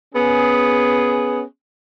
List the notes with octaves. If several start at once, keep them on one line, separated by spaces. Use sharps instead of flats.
B3 C#4 G#4